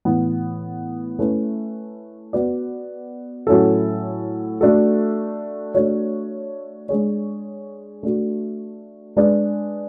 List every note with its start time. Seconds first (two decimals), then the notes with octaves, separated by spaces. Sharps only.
0.05 A2 E3 B3
1.19 A3 C#4 E4 B4
2.33 B3 F#4 B4 D5
3.47 A2 F#3 C#4 E4 A4
4.61 A3 D4 F#4 A4
5.75 A3 D4 F#4 C#5
6.89 G#3 D4 G#4 C#5
8.03 A3 D4 F#4
9.16 G#3 D4 G#4 B4 D5